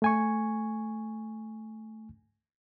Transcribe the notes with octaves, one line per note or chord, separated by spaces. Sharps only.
A3 G#5 C#6